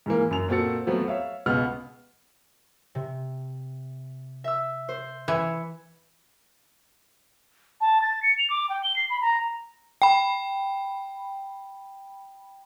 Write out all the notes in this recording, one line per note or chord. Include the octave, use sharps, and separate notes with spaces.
G#2 E3 A#3
F#2 F7
A#2 C4 F#4 A4 A6 C#7
F3 F#3 A3 B3 C4
C#5 E5 F5
C#2 B2 B3 F6
C3
E5 E6
C5
E3 E5 G#6 C#7
A5
A6
C#7
F7
D6
G5
G7
C7
B5
A#5
G5 B5